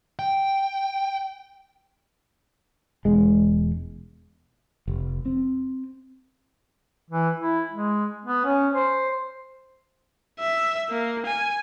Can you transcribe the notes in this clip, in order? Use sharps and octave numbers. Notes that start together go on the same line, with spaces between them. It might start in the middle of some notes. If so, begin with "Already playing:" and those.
G5
E1 G#3
F1
C4
E3
E4
G#3
B3
C#4
C5
E5
A#3
G#5